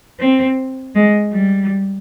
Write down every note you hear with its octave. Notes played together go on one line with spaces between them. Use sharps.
C4
G#3
G3